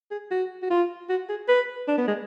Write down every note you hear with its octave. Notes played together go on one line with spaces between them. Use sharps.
G#4
F#4
F#4
F4
F#4
G#4
B4
D4
B3
G#3